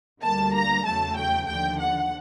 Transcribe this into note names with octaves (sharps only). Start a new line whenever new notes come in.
D2 D3 G3 A#3 A5
A#5
E2 C#3 F#3 A3 A5
G5
D#2 D3 F3 G5
F#5